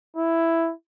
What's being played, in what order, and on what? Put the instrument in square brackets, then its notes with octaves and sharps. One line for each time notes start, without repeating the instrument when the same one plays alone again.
[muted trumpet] E4